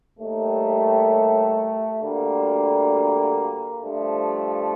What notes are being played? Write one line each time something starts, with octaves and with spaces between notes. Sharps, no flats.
D#2 D#3 G3 A3
D2 D3 G3 A#3
G2 F3 A3